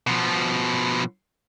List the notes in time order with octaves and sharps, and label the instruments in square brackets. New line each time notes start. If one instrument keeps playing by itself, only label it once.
[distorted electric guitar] B2 F3